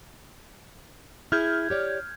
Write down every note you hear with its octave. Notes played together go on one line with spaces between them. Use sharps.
E4 G#4 F6 G6 G#6
G4 C#5 D5